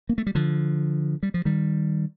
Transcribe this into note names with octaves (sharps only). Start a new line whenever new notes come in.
A#3
A3
G3
D3 F3
G3
F3
D#3 G3